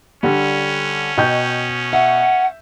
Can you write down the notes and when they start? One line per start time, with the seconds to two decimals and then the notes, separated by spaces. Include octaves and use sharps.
0.23 D3 G3 C#4
1.17 B2 D#5 G5 G6
1.93 E5 F#5